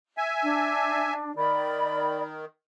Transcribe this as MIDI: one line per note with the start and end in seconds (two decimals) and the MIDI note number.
0.17 1.14 76
0.17 1.14 80
0.42 1.35 62
1.36 2.45 51
1.36 2.22 74
1.36 2.22 83